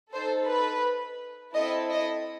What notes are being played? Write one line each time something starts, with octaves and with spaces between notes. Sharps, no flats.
D#4 A4 C5
B4
C4 E4 A4 D#5
D#5